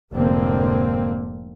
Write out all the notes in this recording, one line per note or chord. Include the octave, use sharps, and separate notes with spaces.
F1 G#2 D3 A#3 C4